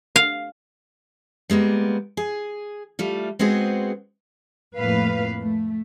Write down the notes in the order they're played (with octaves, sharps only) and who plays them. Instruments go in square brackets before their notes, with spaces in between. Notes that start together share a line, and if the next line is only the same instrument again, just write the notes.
[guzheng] F5
[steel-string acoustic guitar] G3 G#3 A#3 B3
G#4
G3 A3 F4
G#3 B3 C4 F#4 G#4 C5
[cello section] F2 A2 A#3 B4 F5
A3